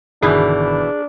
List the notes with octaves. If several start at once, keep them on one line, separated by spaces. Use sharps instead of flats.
G1 B2 D#3 E3 D4 G#4 G6